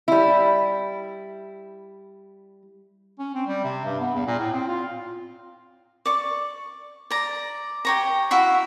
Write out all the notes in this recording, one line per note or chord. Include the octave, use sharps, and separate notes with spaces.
G3 E4
C#4
C4
G3
C3
G2
B3
E2
A#2
A2
C4
F4
D5 C#6
D5 A#5
G4 C#5 A#5
E4 F#4 E5 F5